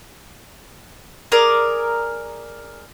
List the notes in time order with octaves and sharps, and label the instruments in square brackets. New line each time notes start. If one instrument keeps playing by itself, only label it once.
[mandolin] G#4 A#4 D5